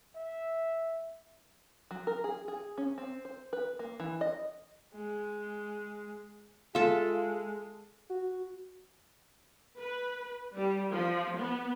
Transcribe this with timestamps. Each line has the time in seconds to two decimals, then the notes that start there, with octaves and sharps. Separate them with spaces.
0.16 E5
1.91 F#3
2.07 A#4
2.24 G#4
2.48 G#4
2.78 C#4
2.98 C4
3.25 C5
3.53 B4
3.79 A#3
4.00 E3
4.21 D#5
4.94 G#3
6.75 G#3 F4 A4 E5
8.10 F#4
9.79 B4
10.54 G3
10.91 F3
11.37 B3